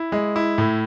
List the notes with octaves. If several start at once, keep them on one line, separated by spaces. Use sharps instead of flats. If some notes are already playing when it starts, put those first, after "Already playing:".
Already playing: E4
G#3
E4
A2